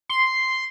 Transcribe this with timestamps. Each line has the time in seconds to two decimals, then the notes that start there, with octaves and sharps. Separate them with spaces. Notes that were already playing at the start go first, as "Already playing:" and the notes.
0.09 C6